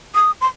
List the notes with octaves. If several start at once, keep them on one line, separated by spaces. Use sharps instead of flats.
D#6
C6